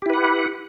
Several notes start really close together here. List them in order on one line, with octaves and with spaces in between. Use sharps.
G4 E4 B4 F#5